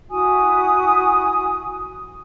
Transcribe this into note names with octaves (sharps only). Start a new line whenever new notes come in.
E4 F#4 G#5 D#6